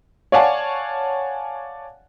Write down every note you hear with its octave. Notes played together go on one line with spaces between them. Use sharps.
C#5 D5 F5 F#5 G#5 A5